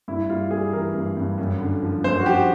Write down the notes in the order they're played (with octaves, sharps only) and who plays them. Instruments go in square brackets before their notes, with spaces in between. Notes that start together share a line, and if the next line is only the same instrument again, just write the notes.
[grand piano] G2 E4
G3 F4
G3 G#4
E3 A#4
G2
G2
F#2
D3
F3
F#2 C5
F#4
F3 G4